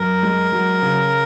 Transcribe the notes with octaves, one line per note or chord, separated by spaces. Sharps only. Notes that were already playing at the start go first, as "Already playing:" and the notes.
Already playing: F#2 A#4
G#3
F#3
C#3